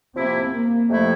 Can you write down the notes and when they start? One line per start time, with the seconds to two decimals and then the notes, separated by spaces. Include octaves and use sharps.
0.16 C3 F3 A#3 C4 E4
0.52 A#3
0.89 F2 C3 F3 A3 E4